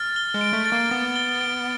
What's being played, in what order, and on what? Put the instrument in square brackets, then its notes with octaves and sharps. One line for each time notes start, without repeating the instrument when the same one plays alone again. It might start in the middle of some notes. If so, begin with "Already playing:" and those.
Already playing: [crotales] F6 A6
G7
[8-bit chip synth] G#3
[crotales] D7
[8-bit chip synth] A3
[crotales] A6
[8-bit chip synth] A#3
[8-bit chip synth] B3 [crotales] A6
[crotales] G7
D7